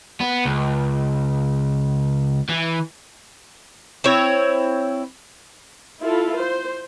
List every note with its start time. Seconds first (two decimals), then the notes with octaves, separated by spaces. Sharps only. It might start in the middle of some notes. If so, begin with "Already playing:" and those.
0.20 B3
0.45 C#2
2.49 E3
4.04 C4 E4 C#5
6.01 E4 F4 A4
6.35 C5